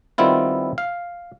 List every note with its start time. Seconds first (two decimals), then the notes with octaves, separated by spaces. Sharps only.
0.18 D#3 G3 B3 C4 E4 F4
0.78 F5